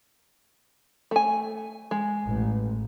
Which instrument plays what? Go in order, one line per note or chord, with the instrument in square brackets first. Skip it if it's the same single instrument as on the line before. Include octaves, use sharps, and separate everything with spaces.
[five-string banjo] A3 G#5
G#3
[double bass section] A1